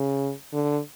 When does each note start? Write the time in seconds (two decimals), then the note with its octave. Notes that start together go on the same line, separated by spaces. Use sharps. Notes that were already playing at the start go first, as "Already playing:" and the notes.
Already playing: C#3
0.53 D3